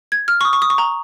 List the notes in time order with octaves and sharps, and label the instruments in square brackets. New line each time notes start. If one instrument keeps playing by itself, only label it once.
[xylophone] G#6
F6
C#6
D#6
C#6
D#6
C#6
A#5